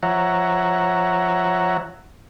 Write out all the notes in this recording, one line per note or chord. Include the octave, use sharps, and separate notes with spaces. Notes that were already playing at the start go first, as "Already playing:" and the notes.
F3 C#5 E5 F#5 A#5